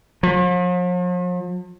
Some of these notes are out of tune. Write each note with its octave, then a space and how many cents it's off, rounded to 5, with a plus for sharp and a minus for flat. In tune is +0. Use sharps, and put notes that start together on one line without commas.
F3 +45